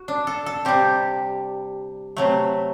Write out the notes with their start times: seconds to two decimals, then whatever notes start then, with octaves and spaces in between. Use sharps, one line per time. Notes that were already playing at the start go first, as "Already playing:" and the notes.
Already playing: F#4
0.08 D4
0.27 A4
0.46 A4
0.65 C3 G3 G4
2.17 C3 F#3 A3